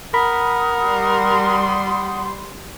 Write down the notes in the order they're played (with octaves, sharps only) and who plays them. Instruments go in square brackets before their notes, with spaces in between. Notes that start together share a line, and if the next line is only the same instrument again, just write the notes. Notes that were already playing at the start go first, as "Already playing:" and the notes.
[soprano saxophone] A#4 [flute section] F#5 D#6 [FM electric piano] B5
[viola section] G3 C6